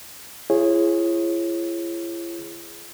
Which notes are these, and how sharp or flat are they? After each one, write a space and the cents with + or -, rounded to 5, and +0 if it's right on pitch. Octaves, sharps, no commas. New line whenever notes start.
E4 +45 G#4 +0 C#5 -30